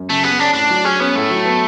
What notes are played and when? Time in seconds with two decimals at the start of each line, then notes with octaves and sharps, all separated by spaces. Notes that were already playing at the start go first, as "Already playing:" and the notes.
Already playing: F#2
0.09 C#3 A3
0.24 B3 G#4
0.39 C#4 D4
0.54 A2 D4
0.70 F#3
0.85 C#4 G#4
1.00 B3 C#4
1.16 A2 A3
1.30 F#3
1.45 B3